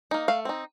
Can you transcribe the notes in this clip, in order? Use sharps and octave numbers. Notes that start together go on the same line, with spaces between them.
A#3 D#4
A3 F5
C4 D#4